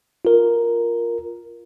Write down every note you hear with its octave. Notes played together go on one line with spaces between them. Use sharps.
F4 A#4